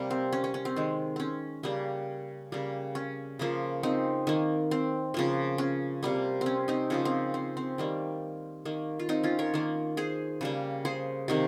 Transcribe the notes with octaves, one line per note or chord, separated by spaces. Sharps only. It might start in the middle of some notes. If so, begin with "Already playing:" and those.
Already playing: C3 G3 A#3
C4
C#4
C#4
C#4
C4
D#3 G#3
C4 C#4
C#3 G3 A#3
C#3 G3 A#3
C#4
C#3 F3 A#3
C4 D#4
D#3 A#3
C4
C#3 F3 A#3
C#4
C3 G3 A#3
C4
C#4
C4 D#4
C#3 F3 A#3 C#4
C4
C4
C4
D#3 G3 A#3
D#3 A#3
F4
C4 D#4
C#4 F4
A#4 C#5
D#3 A#3
G#4 C5
C#3 G3 A#3
G#4 C5
C3 D#3 A#3